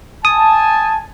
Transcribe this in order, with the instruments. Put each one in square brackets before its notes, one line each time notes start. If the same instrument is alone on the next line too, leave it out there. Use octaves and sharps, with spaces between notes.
[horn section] G#5 A5 [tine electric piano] D#6